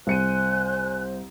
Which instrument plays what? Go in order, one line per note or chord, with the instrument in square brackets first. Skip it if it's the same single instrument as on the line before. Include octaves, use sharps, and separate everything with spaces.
[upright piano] C2 C#7 D#7 [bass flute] C5 [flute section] G#5 F#6